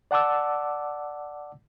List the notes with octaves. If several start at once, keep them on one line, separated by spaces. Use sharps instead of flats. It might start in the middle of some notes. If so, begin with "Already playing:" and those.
D5 F#5 A5 D6 E6